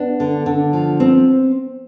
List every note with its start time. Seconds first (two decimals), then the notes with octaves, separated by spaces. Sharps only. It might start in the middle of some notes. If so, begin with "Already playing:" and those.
Already playing: B3 D4
0.20 D3
0.46 D3
0.73 F3
1.00 C4